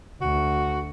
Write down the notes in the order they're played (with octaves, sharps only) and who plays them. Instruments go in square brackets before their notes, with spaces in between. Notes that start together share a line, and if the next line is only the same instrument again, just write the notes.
[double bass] D2 [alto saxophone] F#4